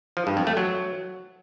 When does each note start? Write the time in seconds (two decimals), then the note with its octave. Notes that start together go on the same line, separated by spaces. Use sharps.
0.17 F3
0.27 G2
0.37 F2
0.47 A3
0.57 F#3